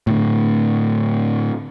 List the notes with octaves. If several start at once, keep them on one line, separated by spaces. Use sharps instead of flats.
A2 D3